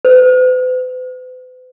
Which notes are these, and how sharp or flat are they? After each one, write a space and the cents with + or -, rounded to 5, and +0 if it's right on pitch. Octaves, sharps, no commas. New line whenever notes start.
B4 +45